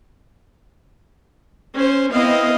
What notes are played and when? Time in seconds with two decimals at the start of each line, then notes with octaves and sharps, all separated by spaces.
1.75 C#4 C5
2.11 B3 C4 E4 D#5 F5